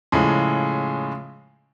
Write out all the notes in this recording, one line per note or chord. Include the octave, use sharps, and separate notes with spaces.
A2 C#3 F3 G#3